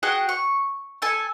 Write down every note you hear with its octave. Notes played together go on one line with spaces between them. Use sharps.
F#4 G#4 F#5 G5
C#6
A4 G#5 E6